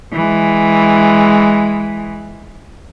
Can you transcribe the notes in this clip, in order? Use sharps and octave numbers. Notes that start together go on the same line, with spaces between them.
E3 G#3